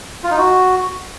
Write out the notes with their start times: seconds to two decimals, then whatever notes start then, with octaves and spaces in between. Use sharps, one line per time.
0.24 F4
0.31 D#4
0.38 F#4